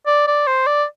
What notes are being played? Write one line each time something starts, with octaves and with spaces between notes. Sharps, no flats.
D5
D5
C5
D5